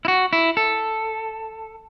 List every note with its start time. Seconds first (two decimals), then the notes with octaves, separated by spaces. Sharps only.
0.05 E4
0.08 F#4
0.33 E4
0.57 A4